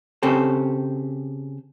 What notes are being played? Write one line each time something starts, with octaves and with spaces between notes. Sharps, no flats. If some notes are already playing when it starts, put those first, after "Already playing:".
C#3 C4 G4 A4